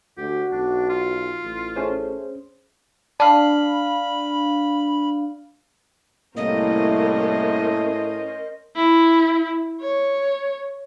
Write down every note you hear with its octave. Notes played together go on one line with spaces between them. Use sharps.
D2 F#4 G4
B1 D4
F4
A1
A3 C#4 G#4 C5
D4 F5 A5 B5
C2 A2 A3 A#3 C#4 A#4 C5 D#5
E4
C#5